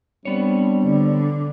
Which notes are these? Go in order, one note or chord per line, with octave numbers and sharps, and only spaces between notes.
G3 B3 C4 D4 C#5
D3